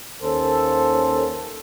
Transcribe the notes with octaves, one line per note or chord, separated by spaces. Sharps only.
D#2 A#3 C#4 A4 C5